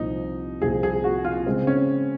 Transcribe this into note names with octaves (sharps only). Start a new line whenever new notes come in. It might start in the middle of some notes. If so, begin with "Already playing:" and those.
Already playing: C2 A#2 F3 C4 D#4
C2 A#2 F3 C4 G#4
G#4
F#4
F4
C#3 G#3 C4
C#4